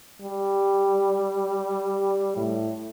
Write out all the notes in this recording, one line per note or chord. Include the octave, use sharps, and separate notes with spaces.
G3
A2